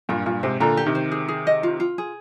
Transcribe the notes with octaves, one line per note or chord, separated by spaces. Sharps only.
G2 A#2 F4
G2 A#2 F4
G#2 C3 C5
A#2 D3 A#5
G4
C3 D#3
C5
G#4
G#4
D#5
F4
F4
G#4